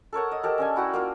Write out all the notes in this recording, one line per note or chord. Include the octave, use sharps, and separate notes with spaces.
A4 A#4 C#5 F#5
D#5
G4 A4 A#4
C#4 D4 G#5
E4 F#4 F#5 G5
A#3 F4 A#4